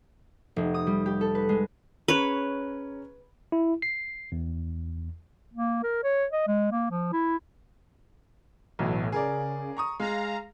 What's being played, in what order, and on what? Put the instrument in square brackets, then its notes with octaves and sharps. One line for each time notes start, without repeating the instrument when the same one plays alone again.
[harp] F1
D#6
G3
G4
A4
B4
G#3
[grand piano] C#4 G#4 A#5 [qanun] B4 C#5
[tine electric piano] E4
C7
E2
[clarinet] A#3
A#4
C#5
D#5
G#3
A#3
F3
E4
[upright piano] B1 [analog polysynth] A2 E3 F#3
[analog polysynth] C#3 [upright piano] G#4 A#4 D5
[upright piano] A#5 C#6 D#6
[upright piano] G#3 [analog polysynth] F5 A#5